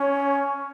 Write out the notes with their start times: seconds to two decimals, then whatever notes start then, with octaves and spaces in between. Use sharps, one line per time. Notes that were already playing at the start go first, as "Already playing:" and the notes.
Already playing: C#4 C#5